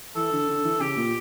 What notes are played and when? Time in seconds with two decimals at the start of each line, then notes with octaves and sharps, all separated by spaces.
0.16 E3 A4
0.32 D3
0.49 D3
0.65 E3
0.80 C#3 G4
0.97 A#2